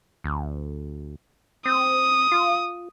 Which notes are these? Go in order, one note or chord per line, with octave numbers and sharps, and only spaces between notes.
D2
C4 D#6
F4